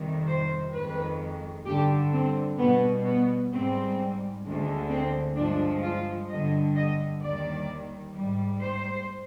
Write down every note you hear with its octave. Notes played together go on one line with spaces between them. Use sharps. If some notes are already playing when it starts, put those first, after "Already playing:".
Already playing: F2 C3 D#3 G3
C5
F2 D#3 G#3 B4
G2 D3 G3 G4
C4
B2 G3 B3
B3
G#2 G3 C4
D2 D3 G#3
C4
G2 F3 G#3 D4
F4
G2 D3 G3 D#5
D#5
D#2 D#3 G3 D5
G#2 G3
C5